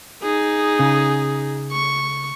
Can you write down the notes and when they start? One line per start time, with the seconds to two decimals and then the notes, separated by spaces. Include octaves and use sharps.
0.23 D#4 G#4
0.79 C#3
1.72 C#6